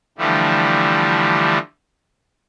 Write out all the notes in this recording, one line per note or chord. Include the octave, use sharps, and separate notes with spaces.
D3 E3 F3 G3 A3